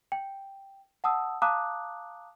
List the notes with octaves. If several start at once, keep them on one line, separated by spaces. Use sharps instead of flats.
G5
F#5 A5 D#6 E6
F5 A5 A#5 D6 D#6 F#6